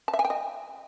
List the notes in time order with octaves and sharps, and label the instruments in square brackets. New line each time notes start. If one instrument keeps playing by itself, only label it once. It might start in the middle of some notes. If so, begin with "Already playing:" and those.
[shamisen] A5
E5
G#5
G5
D#5